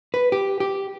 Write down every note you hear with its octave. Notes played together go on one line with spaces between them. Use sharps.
B4
G4
G4